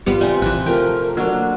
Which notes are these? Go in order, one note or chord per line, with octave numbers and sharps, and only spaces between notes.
G#1 G3 B3 F4 G4
C3 C4 D5 G#5
A1 E3 F#6
F3 A3 A#4 G5
F#3 A#3 D4 F#4